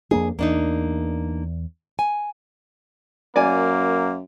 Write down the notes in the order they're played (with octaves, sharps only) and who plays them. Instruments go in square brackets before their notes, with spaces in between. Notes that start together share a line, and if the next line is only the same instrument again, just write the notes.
[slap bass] F2 A#3 D4 [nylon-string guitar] G#4
[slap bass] E2 [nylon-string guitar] A#3 D4 D#4
[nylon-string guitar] G#5
[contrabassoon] F#2 [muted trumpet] A#3 [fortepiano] D5 G#5